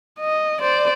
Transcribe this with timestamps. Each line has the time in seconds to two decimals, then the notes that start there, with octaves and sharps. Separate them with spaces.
0.19 D#5
0.61 C5 D5